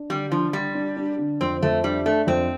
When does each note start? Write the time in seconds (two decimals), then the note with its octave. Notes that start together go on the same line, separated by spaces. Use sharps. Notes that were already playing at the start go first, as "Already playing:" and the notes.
Already playing: D4
0.10 D3 G3
0.32 F3 D4
0.53 G3 D4
0.75 D4
0.97 D4
1.18 D3
1.41 F2 C4
1.63 F2 A3
1.84 G3 D4
2.05 A3 D4
2.27 F2 C4